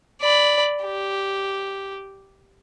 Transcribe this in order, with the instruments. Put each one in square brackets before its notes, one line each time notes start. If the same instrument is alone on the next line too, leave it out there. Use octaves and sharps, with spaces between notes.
[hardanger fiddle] D5 B5
G4